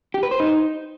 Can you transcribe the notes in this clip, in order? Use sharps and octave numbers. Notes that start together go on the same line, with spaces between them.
G4
B4
C5
D#4